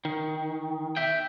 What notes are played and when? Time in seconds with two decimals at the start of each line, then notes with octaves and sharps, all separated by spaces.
0.05 D#3
0.97 E5 G5